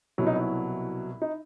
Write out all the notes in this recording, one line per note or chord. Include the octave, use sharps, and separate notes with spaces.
C2 B2 F#3 E4
D#4
E4
D#4